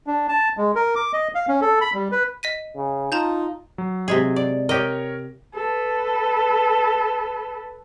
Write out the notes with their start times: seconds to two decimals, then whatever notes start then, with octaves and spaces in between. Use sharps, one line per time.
0.07 D4
0.28 A5
0.57 G#3
0.76 A#4
0.95 D6
1.13 D#5
1.35 F5
1.48 C#4
1.62 A4
1.81 B5
1.94 G3
2.12 B4
2.43 D#5 B6 D#7
2.76 C#3
3.12 D#4 F4 A5 A#5 G6
3.78 F#3
4.08 C3 G#3 G#4
4.36 D5
4.69 G4 A#4 C#5 D#5
5.55 A4 B4